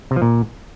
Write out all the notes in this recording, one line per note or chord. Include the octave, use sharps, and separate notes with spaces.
C3
F3
A#2